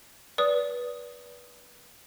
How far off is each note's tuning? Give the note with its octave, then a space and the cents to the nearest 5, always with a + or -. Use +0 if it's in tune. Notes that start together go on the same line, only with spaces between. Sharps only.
B4 -20 D5 -25 D#6 +0